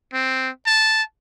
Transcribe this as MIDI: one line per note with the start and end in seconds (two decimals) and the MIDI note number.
0.14 0.49 60
0.66 1.03 81